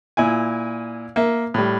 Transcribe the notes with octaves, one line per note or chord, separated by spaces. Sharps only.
A#2 E4 G#5
A#3 E5
A2 G3